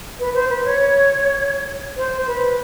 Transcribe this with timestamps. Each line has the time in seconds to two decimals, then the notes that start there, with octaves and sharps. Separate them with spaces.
0.20 B4
0.35 C5
0.50 B4
0.65 C#5
1.97 C5
2.27 B4